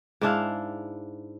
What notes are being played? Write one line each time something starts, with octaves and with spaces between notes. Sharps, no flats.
G#2 D4 E4 F5